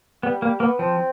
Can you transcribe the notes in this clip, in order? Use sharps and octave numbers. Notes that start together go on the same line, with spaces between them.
G3 B3
G3 A#3
A#3 B3
F3 C4